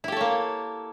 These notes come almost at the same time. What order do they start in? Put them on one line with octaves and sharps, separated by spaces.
E4 G4 A4 C#5 A#3